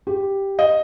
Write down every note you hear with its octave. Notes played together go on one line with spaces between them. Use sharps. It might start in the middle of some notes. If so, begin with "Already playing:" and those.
G4
D#5